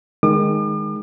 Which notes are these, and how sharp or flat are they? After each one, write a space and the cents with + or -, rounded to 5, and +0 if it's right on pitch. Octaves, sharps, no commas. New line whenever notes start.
D#3 +0 G#3 +0 D6 +45